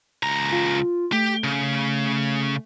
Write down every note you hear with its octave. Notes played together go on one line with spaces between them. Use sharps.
C#2 A#5
F4
A3 G4
C#3